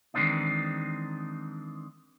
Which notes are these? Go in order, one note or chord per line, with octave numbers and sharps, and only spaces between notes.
D#3 E3 G#3 C4 D4 D#4